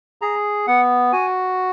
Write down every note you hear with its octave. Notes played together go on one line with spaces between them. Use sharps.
G#4 A#5
B3 F#5
F#4 G#5